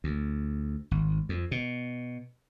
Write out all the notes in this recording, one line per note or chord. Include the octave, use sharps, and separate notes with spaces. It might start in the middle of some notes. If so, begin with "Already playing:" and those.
D2
G#1
F2
B2